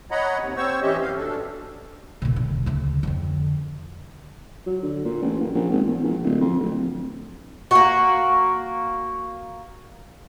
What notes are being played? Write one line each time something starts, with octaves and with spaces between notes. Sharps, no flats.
C#5 D#5 F#5 A#5 B5
D#2 C3
C4 C5 C#5 C#6 E6
E3 C#4 G4 D#5 E5
F#2 F5
B2 D4 A4
A#2 C#3
E1 D3
D2 C#3
F2 D3
F#3
D3
A#2
A1
F#1
A#1
G#1
E2
A#1
D1
F2
D1
A#3 F#4